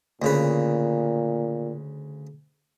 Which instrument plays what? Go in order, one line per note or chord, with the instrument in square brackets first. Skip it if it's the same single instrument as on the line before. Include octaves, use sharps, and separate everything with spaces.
[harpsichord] D2 C#3 B4 [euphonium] A#2